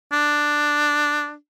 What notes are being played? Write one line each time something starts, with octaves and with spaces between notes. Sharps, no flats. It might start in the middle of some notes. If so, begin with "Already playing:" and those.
D4